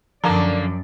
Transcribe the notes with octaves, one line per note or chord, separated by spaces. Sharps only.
F#2 D3 F3 A#3 D5 A5 A#5